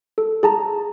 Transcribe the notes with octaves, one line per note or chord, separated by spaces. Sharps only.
A4
G#4 A5 A#5